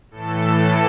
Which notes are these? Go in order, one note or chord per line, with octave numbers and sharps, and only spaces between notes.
A2 E3 A4